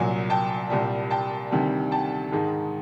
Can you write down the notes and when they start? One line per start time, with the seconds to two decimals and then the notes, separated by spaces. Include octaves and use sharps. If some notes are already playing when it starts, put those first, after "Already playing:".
Already playing: C2 A#2 F#3 G#5
0.30 G5 A5
0.70 C2 A#2 G3
1.11 G5 A5
1.51 D2 C3 D#3 G3
1.91 G5 A5
2.32 G#2 D#3 G#3